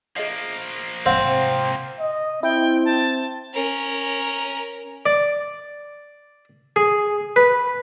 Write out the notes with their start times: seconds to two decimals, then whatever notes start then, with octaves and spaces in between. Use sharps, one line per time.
0.16 F3 A#3 G#4 D#5 E5
1.06 G#2 C3 C4 C5 F5 F#5
2.00 D#5
2.43 C4 E4 G5
2.85 A5
3.54 C#4 A#4
5.06 D5
6.76 G#4
7.36 B4